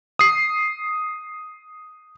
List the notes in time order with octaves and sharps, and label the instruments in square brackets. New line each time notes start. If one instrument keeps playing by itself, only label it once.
[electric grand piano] D#6 C7